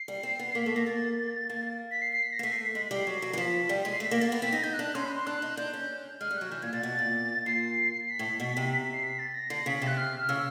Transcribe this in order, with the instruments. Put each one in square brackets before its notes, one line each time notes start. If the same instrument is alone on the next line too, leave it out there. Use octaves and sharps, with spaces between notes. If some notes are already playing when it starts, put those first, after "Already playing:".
Already playing: [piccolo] C7
[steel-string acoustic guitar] G3
C4
B3
[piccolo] C7
[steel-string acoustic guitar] A#3 [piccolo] B6
[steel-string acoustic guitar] A3 [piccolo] B6
[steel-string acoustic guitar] A#3 [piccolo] A#6
[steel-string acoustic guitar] A#3 [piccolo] A6
[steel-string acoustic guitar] A#3
[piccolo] B6
C7
C7
B6
A#6
[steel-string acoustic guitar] A#3
[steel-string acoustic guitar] A3 [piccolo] B6
[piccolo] C7
B6
[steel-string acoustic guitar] G#3 [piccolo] B6
[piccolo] B6
[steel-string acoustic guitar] G3
[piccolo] C7
[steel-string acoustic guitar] F#3
F#3
E3
[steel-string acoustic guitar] F3 [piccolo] B6
[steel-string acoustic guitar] G3
G#3
[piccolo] C7
[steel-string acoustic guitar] A3 [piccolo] B6
[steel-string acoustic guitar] A#3 [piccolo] A#6
[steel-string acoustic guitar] A#3 [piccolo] A6
[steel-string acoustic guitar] B3
[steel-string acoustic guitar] C4 [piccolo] B6
[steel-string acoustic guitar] D#4 [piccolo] A#6
[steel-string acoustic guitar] D#4 [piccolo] G6
[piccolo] F#6
[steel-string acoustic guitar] D4
[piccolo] F#6
[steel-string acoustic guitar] C#4 [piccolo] C6
[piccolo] B5
C6
[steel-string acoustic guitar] D4 [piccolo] F#6
[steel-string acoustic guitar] D#4
[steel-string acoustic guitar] D4 [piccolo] G6
[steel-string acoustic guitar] C#4
[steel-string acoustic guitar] G#3 [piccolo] F6
[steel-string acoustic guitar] G3
[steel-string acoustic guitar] F#3 [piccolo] F#6
[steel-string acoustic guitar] E3 [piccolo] G6
[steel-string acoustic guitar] A#2 [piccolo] G#6
[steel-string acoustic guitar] A#2 [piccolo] A6
[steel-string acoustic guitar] B2
A#2
[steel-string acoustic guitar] A#2 [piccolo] C7
[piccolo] B6
[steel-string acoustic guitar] A2
B2
C3
[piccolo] B6
B6
C7
B6
A6
A#6
[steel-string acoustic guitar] D3 [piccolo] C7
[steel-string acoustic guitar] C#3 [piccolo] B6
[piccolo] B6
[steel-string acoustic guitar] C3
[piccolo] F#6
F6
[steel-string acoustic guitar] C#3 [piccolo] E6